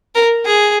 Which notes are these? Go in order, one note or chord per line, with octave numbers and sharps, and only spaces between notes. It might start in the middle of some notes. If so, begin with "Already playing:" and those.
A#4
G#4